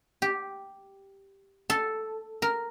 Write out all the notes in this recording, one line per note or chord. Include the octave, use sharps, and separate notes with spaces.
G4
A4
A#4